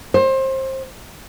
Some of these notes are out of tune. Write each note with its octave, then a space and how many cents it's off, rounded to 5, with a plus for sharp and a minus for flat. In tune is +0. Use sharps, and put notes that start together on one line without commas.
C5 +25